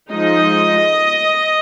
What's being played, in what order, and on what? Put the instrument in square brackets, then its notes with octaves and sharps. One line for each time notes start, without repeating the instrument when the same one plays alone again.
[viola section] F3 G#3 D#4 D#5